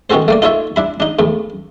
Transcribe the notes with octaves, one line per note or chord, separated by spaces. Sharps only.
D#3 B3 C#4 F#4 A4 C5
A3 A#3 D5
D#4 F4 A4 C#5 E5
D4 E4 B5
D4 D#4
E2 A2